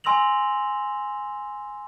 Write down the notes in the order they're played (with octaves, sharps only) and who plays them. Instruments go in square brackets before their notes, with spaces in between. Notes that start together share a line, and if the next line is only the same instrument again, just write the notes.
[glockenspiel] G#5 C6 E6 A#6 F7 F#7